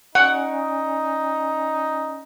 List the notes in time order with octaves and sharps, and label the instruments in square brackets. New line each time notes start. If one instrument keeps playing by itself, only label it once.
[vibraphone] C#4 D5 G#5 [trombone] D#4 [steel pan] F#5